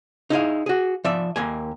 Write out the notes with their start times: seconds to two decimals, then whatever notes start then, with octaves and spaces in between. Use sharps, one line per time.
0.30 D#4 E4 G#4 F5
0.66 F#4 G#4
1.04 F3 D5 E5
1.36 D#2 A#3 G#5